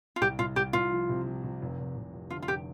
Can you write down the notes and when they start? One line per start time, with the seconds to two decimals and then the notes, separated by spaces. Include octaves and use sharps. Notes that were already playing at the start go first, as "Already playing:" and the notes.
0.16 F4
0.21 C2 G4
0.39 C2 F4
0.56 C2 G4
0.73 C2 F4
0.91 F3
1.09 C3
1.26 F3
1.44 C3
1.62 F1
1.79 F1
1.97 F1
2.14 F1
2.30 D3 F4
2.42 F4
2.48 F1 G4